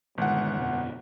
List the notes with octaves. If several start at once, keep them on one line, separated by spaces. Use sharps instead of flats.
G1 A#2 D#3 G#3 F#5
F2 B2 B3